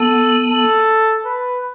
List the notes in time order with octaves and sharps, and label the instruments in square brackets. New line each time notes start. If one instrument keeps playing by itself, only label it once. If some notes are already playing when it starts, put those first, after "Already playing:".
Already playing: [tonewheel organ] B3 [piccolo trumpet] A4
[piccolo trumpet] A4
B4